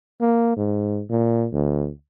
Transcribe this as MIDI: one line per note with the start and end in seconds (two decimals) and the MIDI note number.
0.21 0.55 58
0.57 1.02 44
1.10 1.48 46
1.53 1.90 38